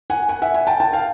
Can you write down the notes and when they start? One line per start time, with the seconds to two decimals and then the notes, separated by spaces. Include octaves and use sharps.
0.10 F#5 G#5
0.29 F#5 G#5
0.42 E5 F#5
0.54 F#5 G#5
0.67 G5 A5
0.80 G5 A5
0.93 F5 G5